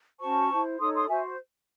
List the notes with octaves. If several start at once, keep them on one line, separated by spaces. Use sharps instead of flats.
C#4 F#4 C5 A5 C#6
E4 C5
D#4 A4 C#5 C6 D#6
C6 D#6
F#4 C5 E5 G#5